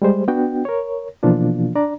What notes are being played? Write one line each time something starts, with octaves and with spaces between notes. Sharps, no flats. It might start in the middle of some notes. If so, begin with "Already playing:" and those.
G3 G#3 C5
B3 D4 F#4 G5
A#4 C#5
B2 E3 F3 A#3 D4 F4
D4 D5 A#5